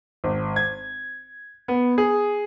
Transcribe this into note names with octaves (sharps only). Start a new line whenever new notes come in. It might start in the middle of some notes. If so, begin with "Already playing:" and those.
G#1
G#6
B3
G#4